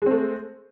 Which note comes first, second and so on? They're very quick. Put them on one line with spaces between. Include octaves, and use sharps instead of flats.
G#3 C4 A3